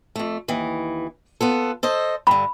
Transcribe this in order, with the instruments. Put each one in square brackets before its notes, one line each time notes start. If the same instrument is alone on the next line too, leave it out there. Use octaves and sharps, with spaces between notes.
[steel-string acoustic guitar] F2 A3
D#2 E3
B3 F4 A4
A4 C5 D#5
[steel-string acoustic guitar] G2 D3 [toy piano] B5